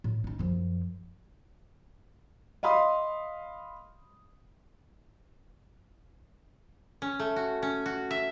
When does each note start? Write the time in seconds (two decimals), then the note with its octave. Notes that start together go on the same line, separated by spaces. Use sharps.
0.04 A2
0.24 C#4 D#4
0.39 F#2 F3
2.63 D#5 F5 B5 C6 D#6
7.02 C#4
7.19 A3
7.36 F#4
7.63 C#4
7.86 F#4
8.11 E5